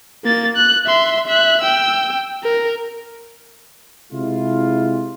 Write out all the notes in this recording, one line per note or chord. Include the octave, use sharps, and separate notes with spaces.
A#3 A6
F#6
E5 C6
E5 F#6
G5 E6
A#4
C3 G#3 E4 F4